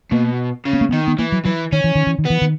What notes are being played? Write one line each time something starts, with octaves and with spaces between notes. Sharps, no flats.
B2 A#3
C#3
B3
A#3
D#3 B3
B3
E3 A#3
F#3
E3 F#3
D#3 C#4
E3
D#3
E3
D#3
E3 B3
D#3